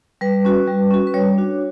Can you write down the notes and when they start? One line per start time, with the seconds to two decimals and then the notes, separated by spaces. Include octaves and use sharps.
0.21 G3 B4
0.45 C#4 F#4
0.67 G3
0.91 C#4 F#4
1.07 B4
1.14 G3 C#5
1.38 D4 F#4